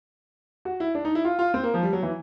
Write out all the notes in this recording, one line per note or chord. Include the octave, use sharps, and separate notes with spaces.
F#4
E4
D4
D#4
E4
F4
F4
C4
A#3
F3
G3
F#3
E3